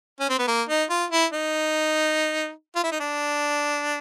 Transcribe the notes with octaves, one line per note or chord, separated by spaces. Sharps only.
C#4
C4
B3
A#3
D#4
F4
E4
D#4
F4
E4
D#4
D4